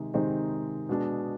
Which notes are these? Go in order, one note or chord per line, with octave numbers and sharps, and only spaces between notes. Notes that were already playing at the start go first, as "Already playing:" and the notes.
Already playing: C3 D#3 G#3 C4 D#4
C3 D#3 G#3 C4 D#4
B2 G#3 D4